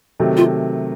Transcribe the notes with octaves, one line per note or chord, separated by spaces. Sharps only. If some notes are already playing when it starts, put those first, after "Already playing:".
C3 D#3 F#3 A3
F4